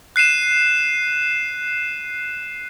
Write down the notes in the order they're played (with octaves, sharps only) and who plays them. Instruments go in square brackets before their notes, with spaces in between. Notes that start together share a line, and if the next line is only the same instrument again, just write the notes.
[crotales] F#6 C7 D#7 E7